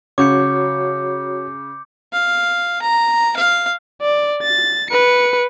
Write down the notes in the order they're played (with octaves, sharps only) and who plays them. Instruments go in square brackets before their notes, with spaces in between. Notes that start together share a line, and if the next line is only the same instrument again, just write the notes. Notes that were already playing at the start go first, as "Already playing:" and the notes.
[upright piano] C#3 [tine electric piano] F#4 C#5 [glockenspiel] D6 G6 C#7
[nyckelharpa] F5
A#5
F5
[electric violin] D5
A6
B4 C#7